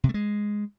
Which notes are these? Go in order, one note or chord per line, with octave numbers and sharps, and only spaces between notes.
C3
A3
G#3